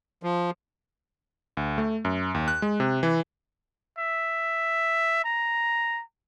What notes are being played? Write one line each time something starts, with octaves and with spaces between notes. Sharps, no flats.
F3
D2
A3
F#2
D#2
F#6
G#3
C3
E3
E5
A#5